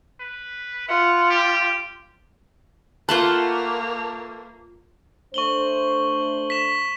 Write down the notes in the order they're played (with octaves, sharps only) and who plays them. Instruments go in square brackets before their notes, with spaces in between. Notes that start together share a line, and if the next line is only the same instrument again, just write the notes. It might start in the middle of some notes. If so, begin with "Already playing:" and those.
[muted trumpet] B4
[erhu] F4 [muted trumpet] F#5
[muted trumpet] G4
[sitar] A3 B4 [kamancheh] A#3 [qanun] F4 C5 F#5 [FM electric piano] A5
[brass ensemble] A3 D4 C5 [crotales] C#6 F#7 G7
[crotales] B6 E7